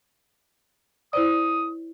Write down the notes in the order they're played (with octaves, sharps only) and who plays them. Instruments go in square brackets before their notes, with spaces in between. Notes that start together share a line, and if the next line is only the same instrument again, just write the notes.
[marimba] E4 C5 D5 [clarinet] D#6